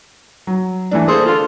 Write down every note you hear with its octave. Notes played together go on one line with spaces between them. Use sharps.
F#3
E3 A3 D4
A#3 G#4 A4 C5
D3 F4